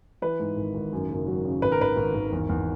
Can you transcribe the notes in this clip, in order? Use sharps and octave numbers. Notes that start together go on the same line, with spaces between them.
E3 B4
G#2
G#1
G#1
F#2
F#1
F#3
C#3
G#1 B4
A#4
G#1 B4
G#1
G#1
E2
E2